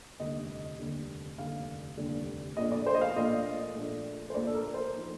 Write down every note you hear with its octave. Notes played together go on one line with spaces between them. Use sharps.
F1 D#2 D3 G3 D4 D#5
F1 D#2 D3 G3 D4
F1 D#2 D3 G3 D4 F5
F1 D#2 D3 G3 D4
A#1 A#2 A3 D4 D#5
D5
C5
D#5
F5
A#1 A#2 A3 D4 D#5
A#1 A#2 A3 D4
C5
A#1 A#2 A3 D4 D5
A4
A#4
C5
F3 A3 D#4